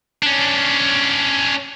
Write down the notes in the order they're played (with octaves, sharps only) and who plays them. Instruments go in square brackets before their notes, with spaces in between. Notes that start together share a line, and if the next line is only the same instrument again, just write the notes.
[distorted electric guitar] C#4 D4